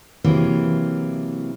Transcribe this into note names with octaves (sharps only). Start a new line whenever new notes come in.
C3 E3 F#3 A#3